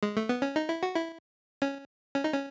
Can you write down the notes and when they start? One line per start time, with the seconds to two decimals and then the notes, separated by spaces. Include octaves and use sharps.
0.03 G#3
0.17 A3
0.29 B3
0.42 C#4
0.56 D#4
0.69 E4
0.83 F#4
0.95 E4
1.62 C#4
2.15 C#4
2.24 D#4
2.33 C#4